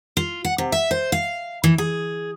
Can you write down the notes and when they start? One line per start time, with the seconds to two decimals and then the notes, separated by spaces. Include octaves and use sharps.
0.17 F4
0.45 F#5
0.58 C3
0.72 E5
0.91 C5
1.12 F5
1.64 E3
1.78 G#4